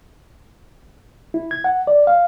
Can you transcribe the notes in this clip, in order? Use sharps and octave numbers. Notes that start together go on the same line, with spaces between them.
E4
G#6
F#5
D5
F5